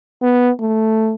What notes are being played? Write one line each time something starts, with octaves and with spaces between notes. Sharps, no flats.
B3
A3